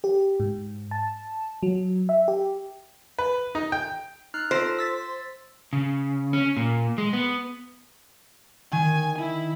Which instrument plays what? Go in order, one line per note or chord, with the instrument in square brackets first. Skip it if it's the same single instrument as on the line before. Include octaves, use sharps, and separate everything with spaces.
[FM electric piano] G4
G#2
A5
F#3
E5
G4
[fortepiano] B4
D#4
G5
[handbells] D#4 F6 F#6
[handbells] F4 A4 A#6 [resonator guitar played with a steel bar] C5
[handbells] E6 A6 B6
[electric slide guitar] C#3
C#4
A#2
G#3
B3
[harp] D#3 [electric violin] G#5
[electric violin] E4